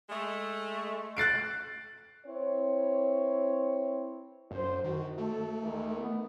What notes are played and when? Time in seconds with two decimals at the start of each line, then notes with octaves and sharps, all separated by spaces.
0.10 G#3 A3
1.17 F#6 A6 C7 D7
2.27 C4 E4 B4 C#5
4.51 F#2 C5
4.84 D#3 F#4
5.18 A3 A4
5.61 D#2 D#3 E3
5.96 B3